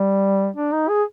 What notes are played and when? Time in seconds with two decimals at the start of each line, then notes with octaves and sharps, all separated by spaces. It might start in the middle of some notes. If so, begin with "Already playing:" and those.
Already playing: G3
0.56 D4
0.72 D#4
0.89 G#4